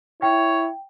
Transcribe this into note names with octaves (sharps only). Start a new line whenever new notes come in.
E4 C#5 G5